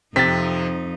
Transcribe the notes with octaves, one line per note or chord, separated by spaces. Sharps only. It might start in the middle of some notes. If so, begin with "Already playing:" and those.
F2 C3 C4 D#4 A6 B6